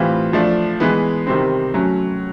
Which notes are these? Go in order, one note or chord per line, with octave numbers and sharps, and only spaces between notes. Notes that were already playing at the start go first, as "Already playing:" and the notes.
Already playing: A2 E3 G3 C4 F4
F3 A3 D4
E3 G#3 B3
C3 D#3 G3 C4
F#3 A3 C#4